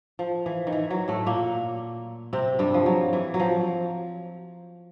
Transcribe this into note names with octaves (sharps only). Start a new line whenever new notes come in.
F3
E3
D#3
E3
F#3
A2 A3
A#2 A#3
C3 C4
G2 G3
F3
F#3
E3
F#3
F3